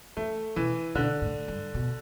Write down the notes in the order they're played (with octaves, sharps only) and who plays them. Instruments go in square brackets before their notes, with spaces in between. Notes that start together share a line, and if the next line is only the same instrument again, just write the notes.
[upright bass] E3 [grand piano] A3
[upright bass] B2 [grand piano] E3
[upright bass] B2 [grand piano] D3
[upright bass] A2
G2
B2